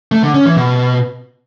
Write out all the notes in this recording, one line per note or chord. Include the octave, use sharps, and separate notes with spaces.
A3
D3
C#4
E3
B2